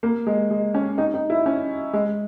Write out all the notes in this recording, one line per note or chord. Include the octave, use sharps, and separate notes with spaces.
A#3
G#3
G#3
C#4
D#4
D#4
E4
C#4
G#3